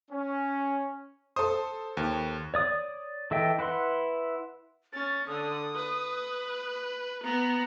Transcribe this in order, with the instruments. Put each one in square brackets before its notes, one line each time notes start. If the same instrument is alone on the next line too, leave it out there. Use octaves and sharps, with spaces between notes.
[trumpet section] C#4
[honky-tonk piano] A4 C5 [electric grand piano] D#6
[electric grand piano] D#2
[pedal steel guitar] C#5 D5 D#6
E3 A4 D#5 E5 G5
E4 B4 F#5 C6
[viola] C#4 [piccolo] A6
[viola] D3 [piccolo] D#6
[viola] B4
[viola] B3 [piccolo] A#5